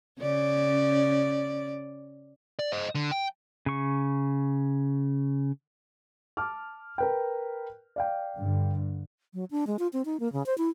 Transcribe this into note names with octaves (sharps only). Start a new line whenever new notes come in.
C#3 C#4 D5
D5
C5 D#5
D3
G5
C#3 C#6
A5 D6 F6
A#4 B4 G5
D5 F5 G5
G2 D3
F#3
D4
G#3
F4
C4
D#4
A#3
C#3
C5
E4